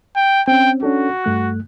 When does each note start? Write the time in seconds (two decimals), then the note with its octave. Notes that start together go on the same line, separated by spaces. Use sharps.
0.16 G5
0.48 C4 C#4 G5
0.83 C#4 D4 F#4 A4
1.24 G2 A3 F#6